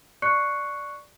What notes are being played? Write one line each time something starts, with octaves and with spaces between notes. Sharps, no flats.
D5 C#6 F#6 C7 C#7